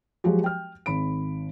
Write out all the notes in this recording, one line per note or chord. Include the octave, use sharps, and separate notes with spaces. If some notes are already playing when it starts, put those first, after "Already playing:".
F3 F#3 G#3 F#4 G4
G5 F6
G#1 B5 D7